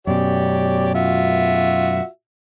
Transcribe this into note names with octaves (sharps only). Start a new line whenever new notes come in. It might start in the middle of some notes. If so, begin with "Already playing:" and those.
F#2 B2 G4 C#5 D5
F4 F#4 E5